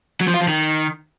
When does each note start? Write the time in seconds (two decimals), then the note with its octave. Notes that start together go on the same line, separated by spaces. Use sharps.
0.21 F#3
0.27 F3
0.34 F4
0.41 F3
0.48 D#3